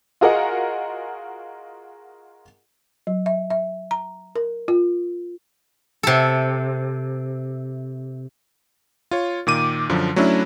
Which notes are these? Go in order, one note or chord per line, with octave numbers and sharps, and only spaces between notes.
F4 F#4 G#4 A#4 D#5 F#5
F#3
E5
E5
A#5
A#4
F4
C3 A4
F4 C#5
A#2 D#3 D6 D#7
F#2 D3 F3
F#3 A3 C#4 D4 E4